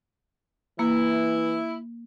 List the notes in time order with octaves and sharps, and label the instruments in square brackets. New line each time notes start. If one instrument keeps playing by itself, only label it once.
[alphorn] E3 [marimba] A#3 [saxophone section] E4